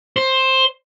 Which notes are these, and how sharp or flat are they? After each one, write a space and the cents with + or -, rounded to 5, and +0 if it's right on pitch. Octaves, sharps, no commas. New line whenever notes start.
C5 +10